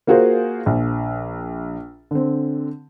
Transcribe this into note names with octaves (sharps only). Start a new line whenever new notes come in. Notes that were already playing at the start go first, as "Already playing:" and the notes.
A#3 F4 F#4 G#4 A#4 C5
A#1
D3 C4